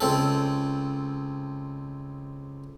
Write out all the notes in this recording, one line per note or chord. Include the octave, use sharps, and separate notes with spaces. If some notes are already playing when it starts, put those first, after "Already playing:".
C#2 C4 A4